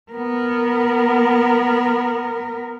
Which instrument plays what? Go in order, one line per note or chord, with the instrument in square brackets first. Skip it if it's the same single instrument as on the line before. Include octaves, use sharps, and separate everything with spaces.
[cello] B3 A#4